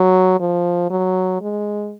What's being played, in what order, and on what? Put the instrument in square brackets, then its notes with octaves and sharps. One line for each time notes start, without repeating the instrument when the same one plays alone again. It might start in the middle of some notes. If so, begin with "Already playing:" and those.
Already playing: [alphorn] F#3
F3
F#3
G#3